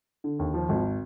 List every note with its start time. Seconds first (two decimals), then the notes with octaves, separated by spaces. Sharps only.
0.24 D3
0.39 D#2
0.54 F3
0.69 G#1